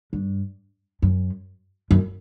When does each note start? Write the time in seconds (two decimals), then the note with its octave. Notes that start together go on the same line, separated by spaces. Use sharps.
0.13 G2
1.02 F#2
1.91 F#2